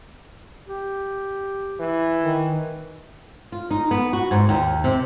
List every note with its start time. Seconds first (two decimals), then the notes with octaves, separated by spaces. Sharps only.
0.68 G4
1.80 E3
2.23 D#3
3.52 F4
3.71 D#4
3.91 B3
4.13 F#4
4.31 G#2
4.49 D#2
4.84 C3